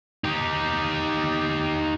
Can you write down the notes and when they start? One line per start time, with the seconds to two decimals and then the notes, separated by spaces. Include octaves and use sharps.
0.24 D#4 G4